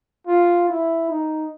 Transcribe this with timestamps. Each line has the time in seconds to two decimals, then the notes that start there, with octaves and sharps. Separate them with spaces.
0.27 F4
0.69 E4
1.10 D#4